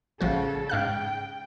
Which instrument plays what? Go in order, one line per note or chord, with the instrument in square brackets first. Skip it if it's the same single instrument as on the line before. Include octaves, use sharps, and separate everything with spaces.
[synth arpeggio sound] A1 F3 F#4 [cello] C#3 A4
[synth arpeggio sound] G#2 F5 F#6 [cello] G5